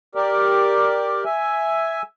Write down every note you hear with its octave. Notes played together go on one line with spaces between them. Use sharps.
G4 A#4 D5
E5 G#5